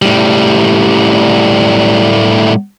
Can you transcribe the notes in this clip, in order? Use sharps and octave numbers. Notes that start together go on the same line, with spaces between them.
A2 G3